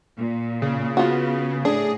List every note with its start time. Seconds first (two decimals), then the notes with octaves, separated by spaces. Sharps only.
0.17 A#2
0.62 C#3
0.97 B3 F4 F#4
1.65 A2 D4 G#4